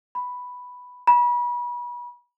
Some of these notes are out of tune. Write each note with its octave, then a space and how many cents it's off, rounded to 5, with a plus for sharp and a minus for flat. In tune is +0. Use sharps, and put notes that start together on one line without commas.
B5 +0
B5 -30